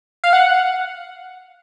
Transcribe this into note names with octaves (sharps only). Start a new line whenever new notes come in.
F5
F#5